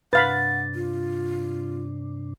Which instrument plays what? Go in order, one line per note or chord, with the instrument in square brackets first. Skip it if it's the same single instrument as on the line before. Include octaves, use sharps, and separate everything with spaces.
[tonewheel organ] G2 C3 D4 [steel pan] B4 F5 B5 [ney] F#5 [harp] A6
[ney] F4